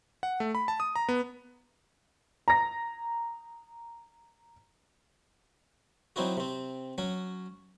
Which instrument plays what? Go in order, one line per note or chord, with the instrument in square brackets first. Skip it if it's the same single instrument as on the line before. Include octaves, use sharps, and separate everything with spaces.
[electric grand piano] F#5
A3
B5
A5
D#6
A#5
B3
[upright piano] A#5 A#6
[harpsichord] F#3 C4 D#4 E4 F#4
C3 C4
F#3 C#4 F#4